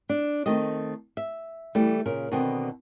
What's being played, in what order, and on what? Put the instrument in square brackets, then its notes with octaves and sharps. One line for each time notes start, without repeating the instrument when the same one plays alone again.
[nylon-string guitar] D4
D#3 A3 C4 D#5
E5
E3 G3 A3
A#2 C#3 A#4
B2 D3 D#3 B3 C4